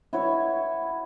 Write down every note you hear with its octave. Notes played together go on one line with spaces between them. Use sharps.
E4 F#4 C#5